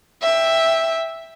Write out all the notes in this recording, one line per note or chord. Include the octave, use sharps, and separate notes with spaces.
E5 G5